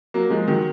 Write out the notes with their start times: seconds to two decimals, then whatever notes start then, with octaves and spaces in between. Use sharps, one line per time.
0.14 F#3 A#3
0.30 F3 G#3
0.47 D#3 F#3